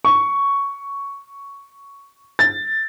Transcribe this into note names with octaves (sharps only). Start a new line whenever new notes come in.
C#6
A6